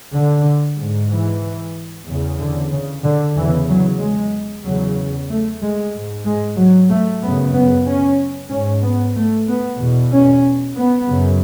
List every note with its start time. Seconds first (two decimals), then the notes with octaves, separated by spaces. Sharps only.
0.14 D3
0.78 G#2
1.11 E3
2.08 E2 C#3
2.40 D3
2.71 C#3
3.04 D3
3.36 E2 C#3 E3
3.68 F#3
4.00 G#3
4.64 E2 C#3 F#3
5.29 A3
5.61 G#3
5.94 G#2
6.25 G#3
6.57 F#3
6.90 A3
7.22 F#2 C#3 B3
7.54 B3
7.86 C#4
8.50 G#2 C#4
8.84 B3
9.16 A3
9.48 B3
9.79 E2 B2
10.12 C#4
10.77 B3
11.08 F#2 C#3